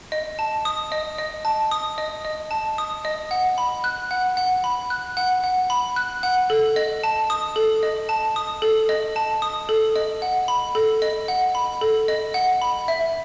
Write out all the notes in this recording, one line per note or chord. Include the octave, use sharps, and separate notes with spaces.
D#5
A5
D#6
D#5
D#5
A5
D#6
D#5
D#5
A5
D#6
D#5
F#5
B5
F#6
F#5
F#5
B5
F#6
F#5
F#5
B5
F#6
F#5
A4
D#5
A5
D#6
A4
D#5
A5
D#6
A4
D#5
A5
D#6
A4
D#5
F#5
B5
A4
D#5
F#5
B5
A4
D#5
F#5
B5
E5